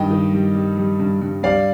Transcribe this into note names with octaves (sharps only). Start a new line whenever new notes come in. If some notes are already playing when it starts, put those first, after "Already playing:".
Already playing: G2 D#3 D#5 G5
D#3
G3
G3
G3
G2
G2
G3 D5 F5